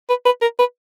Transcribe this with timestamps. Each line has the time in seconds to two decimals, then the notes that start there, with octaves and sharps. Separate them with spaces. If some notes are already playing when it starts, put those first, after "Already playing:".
0.09 B4
0.25 B4
0.42 A#4
0.59 B4